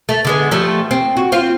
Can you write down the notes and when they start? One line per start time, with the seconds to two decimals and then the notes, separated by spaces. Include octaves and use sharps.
0.09 A3
0.25 D3 G#3 B3
0.51 F3 G3 A3
0.91 C4
1.17 F#4
1.32 C4 F4